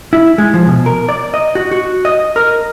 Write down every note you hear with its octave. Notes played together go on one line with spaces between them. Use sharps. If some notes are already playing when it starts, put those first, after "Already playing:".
E4
G#3
F3
B2
A#4
D5
D#5
F#4
F#4
D#5
A#4